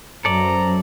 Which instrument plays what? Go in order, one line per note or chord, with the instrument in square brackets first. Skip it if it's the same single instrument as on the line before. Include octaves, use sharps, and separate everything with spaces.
[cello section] F#2 [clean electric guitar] A4 D5 [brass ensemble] C5 A#5